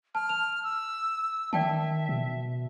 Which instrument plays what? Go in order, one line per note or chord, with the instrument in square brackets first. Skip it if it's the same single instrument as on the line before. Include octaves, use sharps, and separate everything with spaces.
[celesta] A5 [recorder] F6
[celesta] F7
[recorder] E6
[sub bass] D#3 [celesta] D5 G5 A5 [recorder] E5
[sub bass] B2